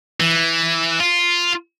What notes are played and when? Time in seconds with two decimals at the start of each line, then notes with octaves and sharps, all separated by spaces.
0.20 E3
1.00 F4